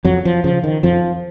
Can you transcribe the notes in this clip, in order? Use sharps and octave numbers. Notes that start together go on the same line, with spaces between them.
F2 F#3
F3
C#3 F3
D#3
F2 F3